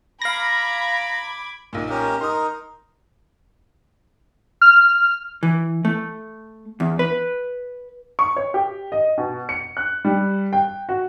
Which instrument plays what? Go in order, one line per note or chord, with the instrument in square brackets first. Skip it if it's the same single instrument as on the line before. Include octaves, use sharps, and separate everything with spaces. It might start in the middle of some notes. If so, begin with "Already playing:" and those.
[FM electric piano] F5 A#6 [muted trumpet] A#5 [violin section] B5 D6 G#6
[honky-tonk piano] B1 A#2
[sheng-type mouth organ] C#4 G4 A#4
[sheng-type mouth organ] D#4 A#4 [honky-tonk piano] C6 D#6
[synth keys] F6
[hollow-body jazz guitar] E3
A3
E2
B4
[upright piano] C#6
C#5
G4
D#5
B2
C#7
F#6
G3
G5
F#4